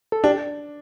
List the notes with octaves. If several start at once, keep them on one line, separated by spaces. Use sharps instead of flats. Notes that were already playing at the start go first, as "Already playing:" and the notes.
A4
D4 G4